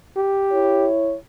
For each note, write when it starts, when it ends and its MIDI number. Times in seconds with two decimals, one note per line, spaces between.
0.17 0.88 67
0.52 1.16 64
0.52 1.16 73